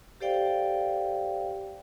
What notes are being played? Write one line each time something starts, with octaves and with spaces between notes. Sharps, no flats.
G4 A4 C5 D5 F5 G5